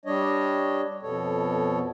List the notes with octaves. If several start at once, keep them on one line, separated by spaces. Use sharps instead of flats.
G3 D4 C#5 D#5
F2 B2 B3 A4 C#5